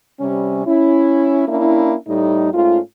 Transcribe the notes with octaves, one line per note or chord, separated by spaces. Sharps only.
C3 G3 C#4
C#4 E4
A#3 C#4 D4 E4
A2 G3 D#4
G#2 A3 C#4 F4